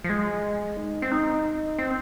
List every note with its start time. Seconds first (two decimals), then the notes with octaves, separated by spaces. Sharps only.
0.04 F3
0.09 G#3
0.77 D#4
1.02 C4
1.12 D#4
1.79 C4